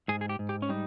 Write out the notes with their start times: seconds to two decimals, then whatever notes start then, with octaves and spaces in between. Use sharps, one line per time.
0.08 G#2 G#4
0.21 G#4
0.29 G4
0.39 G#2
0.49 G4
0.62 C#4
0.69 G3 D#4